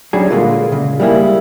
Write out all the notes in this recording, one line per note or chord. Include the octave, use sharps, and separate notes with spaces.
F#3 G3 C#4 D4 G#4
A#2 D3 G#3 A#3 F4
C#3
G3 G#3 A#3 E4